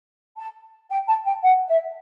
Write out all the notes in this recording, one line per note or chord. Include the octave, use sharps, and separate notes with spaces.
A5
G5
A5
G5
F#5
E5